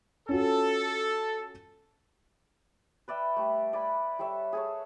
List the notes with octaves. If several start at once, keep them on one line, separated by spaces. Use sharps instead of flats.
C#4 F4 F#4 A4
B4 D5 E5 G5
G3 A3
D5 G#5 B5
G3 A4 C#5 E5
G#4 A4 C#5